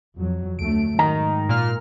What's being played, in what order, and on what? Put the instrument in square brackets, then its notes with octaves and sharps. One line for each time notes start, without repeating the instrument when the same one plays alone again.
[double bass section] F2 F#3
[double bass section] D2 F#3 A3 [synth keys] D7
[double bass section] G#2 [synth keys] D#3 [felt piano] A#5
[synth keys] A#2 F6